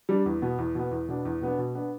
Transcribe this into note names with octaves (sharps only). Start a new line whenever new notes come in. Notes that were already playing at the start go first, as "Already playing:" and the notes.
G3 D4
E2
B2 B3
E2
B2 B3
E2
B2 B3 D4
E2
B2 B3 D4
B2
B3 D4